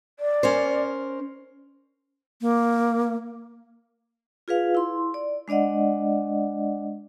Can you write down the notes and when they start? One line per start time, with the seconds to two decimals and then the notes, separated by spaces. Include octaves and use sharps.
0.19 D5
0.43 C#4 A#4 C5
2.41 A#3
4.48 F4 G#4 B4 F5
4.75 E4 C6
5.14 D5
5.48 G#3 D4 D5 D#5 F#5